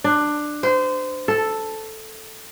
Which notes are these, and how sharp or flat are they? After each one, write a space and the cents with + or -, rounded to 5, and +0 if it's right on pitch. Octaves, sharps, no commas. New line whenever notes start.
D4 +15
C5 -25
A4 +0